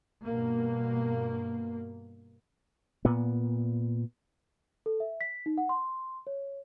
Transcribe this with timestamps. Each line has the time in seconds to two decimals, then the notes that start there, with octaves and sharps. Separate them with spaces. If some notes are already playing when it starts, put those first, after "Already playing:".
0.24 G2 B2 A#3
3.05 A#2 B3
4.86 A4
5.00 E5
5.21 B6
5.46 D#4
5.58 F#5
5.69 C6
6.27 C#5